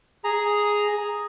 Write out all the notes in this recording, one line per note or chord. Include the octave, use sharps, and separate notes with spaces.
G#4 A#5